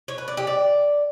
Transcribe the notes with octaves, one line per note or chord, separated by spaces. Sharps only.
C#5
B4
D5
G4
D5